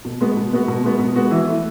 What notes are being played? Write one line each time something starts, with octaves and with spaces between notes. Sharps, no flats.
B2
G#3 B3 F#4
B2
G#3 B3 F#4
B2
G#3 B3 F#4
B2
G#3 B3 F#4
E3
A3 E4